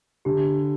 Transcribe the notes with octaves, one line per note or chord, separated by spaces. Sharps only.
D3 G4